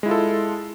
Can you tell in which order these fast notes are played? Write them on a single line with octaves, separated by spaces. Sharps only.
G#3 E4 F4 A4